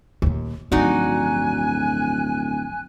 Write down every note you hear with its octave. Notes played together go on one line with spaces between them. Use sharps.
D#2 A#2
D1 G2 F3 D#4 F#4 D5 G#5 F#6